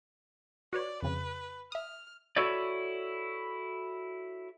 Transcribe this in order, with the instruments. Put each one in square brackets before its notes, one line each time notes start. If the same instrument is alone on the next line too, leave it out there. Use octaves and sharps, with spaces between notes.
[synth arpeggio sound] F#4 B4 C#5 [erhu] D5
[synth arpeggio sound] F2 C#3 [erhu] B4
[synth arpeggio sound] E5 D#6 [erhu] F6
[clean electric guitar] E4 F#4 A4 B4 C#5 D5